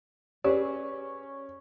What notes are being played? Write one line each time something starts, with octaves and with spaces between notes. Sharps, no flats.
C#4 G4 G#4 B4 D5